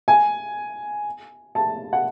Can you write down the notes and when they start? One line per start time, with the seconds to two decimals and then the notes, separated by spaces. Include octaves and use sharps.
0.08 G#5
1.55 A5
1.93 F#5